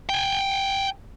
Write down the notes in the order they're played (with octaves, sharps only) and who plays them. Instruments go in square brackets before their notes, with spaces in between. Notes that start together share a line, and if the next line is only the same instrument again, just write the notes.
[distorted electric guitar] G5 G#5